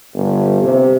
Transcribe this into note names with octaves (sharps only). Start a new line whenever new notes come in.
G1
C3